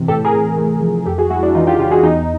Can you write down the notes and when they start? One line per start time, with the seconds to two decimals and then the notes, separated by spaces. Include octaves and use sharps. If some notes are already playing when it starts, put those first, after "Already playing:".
Already playing: C3 E3
0.08 A2 G4 A4
0.25 G#4 A#4
0.33 A2
0.57 A3
0.81 F3
1.06 F2 G4 A4
1.18 F#4 G#4
1.30 G#3 E4 F#4
1.43 D4 E4
1.55 E3 D#4 F4
1.67 F4 G4
1.79 C#3 F4 G4
1.91 F#4 G#4
2.03 E2 D#4